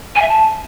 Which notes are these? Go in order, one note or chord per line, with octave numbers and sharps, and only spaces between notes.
G#5
E5
A5